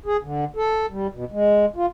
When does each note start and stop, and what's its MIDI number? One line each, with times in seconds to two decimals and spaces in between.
0.06 0.17 68
0.23 0.45 50
0.56 0.86 69
0.90 1.07 55
1.13 1.25 47
1.32 1.66 56
1.76 1.86 65